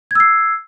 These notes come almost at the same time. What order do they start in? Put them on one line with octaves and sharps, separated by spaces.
G#6 E6 C7